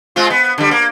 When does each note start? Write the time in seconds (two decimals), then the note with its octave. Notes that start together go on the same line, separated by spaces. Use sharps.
0.16 G#3 C4 F4
0.30 B3
0.58 D3 G3
0.71 A#3